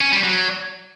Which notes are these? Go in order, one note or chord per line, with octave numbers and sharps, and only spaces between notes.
C#4
G3
F#3